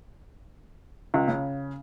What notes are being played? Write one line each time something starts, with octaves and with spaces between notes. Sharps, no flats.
C#2
C#3